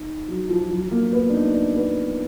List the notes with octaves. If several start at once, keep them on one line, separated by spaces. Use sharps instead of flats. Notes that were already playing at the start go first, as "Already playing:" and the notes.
Already playing: D#4
F#3
F3
F#3
A#3
B3
D4
D#4
D4
B3